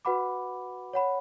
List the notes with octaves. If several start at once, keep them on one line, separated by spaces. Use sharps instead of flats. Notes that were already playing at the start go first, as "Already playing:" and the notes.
F#4 B4 F#5 B5 D6
C#5 F#5 B5